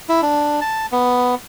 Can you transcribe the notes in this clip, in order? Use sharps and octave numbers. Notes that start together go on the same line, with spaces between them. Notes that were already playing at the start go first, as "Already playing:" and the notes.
E4
D4
A5
B3